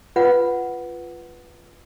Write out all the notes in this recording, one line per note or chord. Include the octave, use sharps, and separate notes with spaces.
F4 B4 F#5